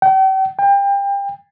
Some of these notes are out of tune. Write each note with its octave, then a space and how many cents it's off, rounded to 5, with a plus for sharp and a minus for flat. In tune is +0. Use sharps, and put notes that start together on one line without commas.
G5 -40
G5 +30